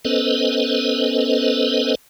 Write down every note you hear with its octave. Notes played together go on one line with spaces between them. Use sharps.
B3 C#4 A4 B4 C5 D#5